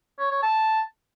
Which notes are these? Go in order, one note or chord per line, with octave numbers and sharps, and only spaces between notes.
C#5
C#5
A5